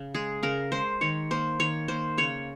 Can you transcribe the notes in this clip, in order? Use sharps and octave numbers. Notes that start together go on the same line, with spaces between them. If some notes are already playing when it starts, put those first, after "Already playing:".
Already playing: C#3
G#3 G#4
C#3 A#4
G#3 C5
D#3 C#5
A#3 C5
D#3 C#5
A#3 C5
C#3 C#5